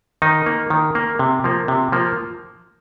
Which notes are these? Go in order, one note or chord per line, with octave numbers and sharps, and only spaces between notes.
D#3 D#4
A#3
D#3
A#3
C3
F3 A#3
C3
F3 A#3